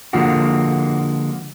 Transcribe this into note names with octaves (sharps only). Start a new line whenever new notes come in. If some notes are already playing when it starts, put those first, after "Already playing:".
D3 F3 G#3 A#3 F#4